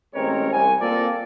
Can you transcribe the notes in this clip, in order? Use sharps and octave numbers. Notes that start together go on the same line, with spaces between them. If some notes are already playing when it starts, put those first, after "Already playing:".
A1 G#3 C4 A#4 C#5
C2 G#5
A#3 C4 F4 A4 A#4 D5